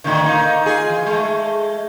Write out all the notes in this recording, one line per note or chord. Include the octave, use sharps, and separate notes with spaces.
A2 D3 D#3
A#3 D#4
F4 G#4
E3
G#3 A3